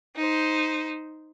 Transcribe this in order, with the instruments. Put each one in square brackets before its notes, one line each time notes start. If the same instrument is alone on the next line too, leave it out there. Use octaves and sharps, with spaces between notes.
[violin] D#4 C5